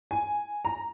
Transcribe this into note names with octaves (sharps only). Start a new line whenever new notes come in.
G#5
A#5